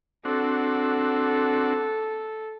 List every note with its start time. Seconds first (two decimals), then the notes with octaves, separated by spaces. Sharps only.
0.25 C4 D4 F#4 A4